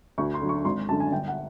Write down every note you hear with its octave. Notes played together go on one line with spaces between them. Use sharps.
D2 C#6
C6
D3 F#3
C#6
G#1 C6
F#2 D3 A5
G#5
G1 G5
F#5